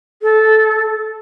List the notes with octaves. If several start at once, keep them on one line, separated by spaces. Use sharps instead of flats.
A4